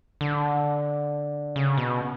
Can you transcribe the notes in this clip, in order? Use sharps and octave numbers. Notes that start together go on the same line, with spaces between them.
D3
C#3
B2